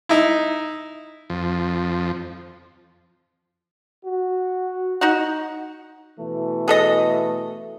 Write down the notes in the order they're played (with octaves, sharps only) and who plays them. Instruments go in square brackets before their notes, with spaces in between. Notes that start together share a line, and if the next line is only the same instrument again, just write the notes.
[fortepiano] D#4 E4
[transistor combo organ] F2
[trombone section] F#4
[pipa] D#4 F#4 F#5
[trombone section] B2 E3 A3
[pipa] G#4 A4 D#5